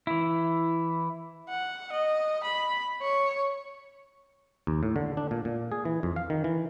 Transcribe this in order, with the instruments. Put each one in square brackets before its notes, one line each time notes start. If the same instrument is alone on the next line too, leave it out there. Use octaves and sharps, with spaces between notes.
[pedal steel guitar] E3 E4
[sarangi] F#5
D#5
B5
C#5
[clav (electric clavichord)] D#2
A2
D3
D4
A#2
A#2
G#4
E3
F2
F5
D#3
E3